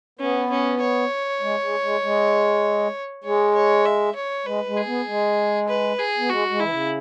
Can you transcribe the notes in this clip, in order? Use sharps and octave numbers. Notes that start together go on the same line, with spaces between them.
B3 C#4
C#4
C#5
G#3
G#3
G#3
G#3
G#3 C#5
C#5
E5
C#5
G#3 B4
G#3
G#4
B3
G#3
B4
G#4
B3
G#3 F#4
G#3
E3 E4
C#3